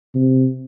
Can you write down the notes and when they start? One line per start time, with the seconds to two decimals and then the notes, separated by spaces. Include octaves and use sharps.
0.15 C3